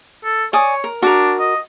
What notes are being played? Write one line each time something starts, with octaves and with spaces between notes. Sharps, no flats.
A4
C#5 D5 G#5 D#6
A#4
D4 F#4 A#4
D#5